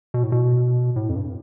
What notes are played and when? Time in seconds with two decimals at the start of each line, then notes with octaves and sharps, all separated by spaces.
0.14 B2
0.23 A2
0.32 B2
0.96 A2
1.09 F2
1.16 G2